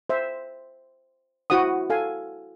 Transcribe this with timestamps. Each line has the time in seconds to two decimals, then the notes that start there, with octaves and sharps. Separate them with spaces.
0.10 C5 E5
1.50 E4 F#4 C5 F#5 D#6
1.90 A4 F5 G#5